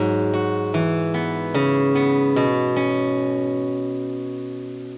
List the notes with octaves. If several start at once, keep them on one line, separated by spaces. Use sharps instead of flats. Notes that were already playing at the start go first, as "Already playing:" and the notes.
Already playing: G#2 F#3
F#4
E3
B3
C#3
B3
B2
C#4